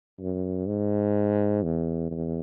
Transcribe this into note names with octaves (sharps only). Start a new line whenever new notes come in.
F#2
G#2
E2
E2